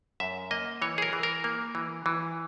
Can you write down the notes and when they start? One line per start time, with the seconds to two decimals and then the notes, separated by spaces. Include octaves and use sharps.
0.20 F#2 E5
0.51 A#3 D#5
0.82 E3 C#5
0.98 G#4
1.02 A#4
1.13 E3
1.23 A#4
1.44 A#3
1.75 E3
2.06 E3